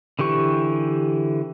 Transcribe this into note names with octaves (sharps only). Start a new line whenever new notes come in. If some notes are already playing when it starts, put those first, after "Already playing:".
D3 E3 G4 C#6